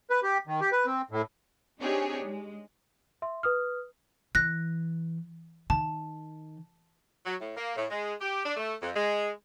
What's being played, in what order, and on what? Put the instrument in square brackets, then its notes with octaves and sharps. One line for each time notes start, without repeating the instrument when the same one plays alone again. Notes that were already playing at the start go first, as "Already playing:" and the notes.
[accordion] B4
G4
D#3
G4
B4
C4
A2
[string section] C4 D4 D#4 G4 G#4 C#5
G#3
[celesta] E5 C6
B4 D#6 F6
[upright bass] E3 [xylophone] F#6 A#6
[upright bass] D#3 [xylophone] A5
[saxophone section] F#3
A2
A#3
A2
G#3
G4
D4
A3
F2
G#3